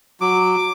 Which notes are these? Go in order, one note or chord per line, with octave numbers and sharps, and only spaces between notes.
F#3 D6